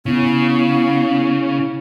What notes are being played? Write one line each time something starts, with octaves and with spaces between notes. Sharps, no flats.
C#3 B3 E4